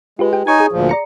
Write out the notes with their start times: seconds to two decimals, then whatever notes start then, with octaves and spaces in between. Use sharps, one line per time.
0.19 G#3 F4 G4 B4
0.33 G4 G5
0.47 D#4 C#5 G#5 C#6 G#6
0.59 G#4 D#6
0.72 D2 A#2 F3
0.89 D5 A#5 C#7